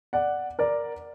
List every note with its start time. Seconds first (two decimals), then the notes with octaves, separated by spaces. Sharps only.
0.13 D5 F#5
0.59 A#4 D5